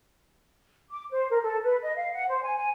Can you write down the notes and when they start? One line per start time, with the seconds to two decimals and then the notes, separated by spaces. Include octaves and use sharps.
0.90 D6
1.10 C5
1.30 A#4
1.42 A4
1.63 B4
1.81 D#5
1.96 F5
2.11 F#5
2.28 C5
2.42 G#5
2.56 G#5